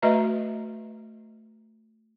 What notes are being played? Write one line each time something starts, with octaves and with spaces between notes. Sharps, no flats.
A3 F#4 B4 D#5 E5 A#5